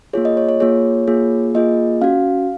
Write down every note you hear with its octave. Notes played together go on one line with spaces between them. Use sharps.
A#3 F4 G#4 C#5
D#5
C#5
C#5
A#3 F4 G#4 C#5
A#3 F4 G#4
A#3 F4 G#4 D#5
C#4 F#4 F5